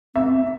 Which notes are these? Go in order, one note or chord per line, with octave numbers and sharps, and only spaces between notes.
C4 E5